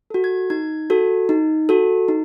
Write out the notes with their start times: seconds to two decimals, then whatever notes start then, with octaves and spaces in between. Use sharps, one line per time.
0.10 F#4 A4
0.24 G#6
0.50 D#4 G#6
0.90 F#4 A4
1.29 D#4
1.69 F#4 A4
2.08 D#4